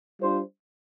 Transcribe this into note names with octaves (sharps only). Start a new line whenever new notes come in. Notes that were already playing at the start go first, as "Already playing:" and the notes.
G3 D4 F4 C5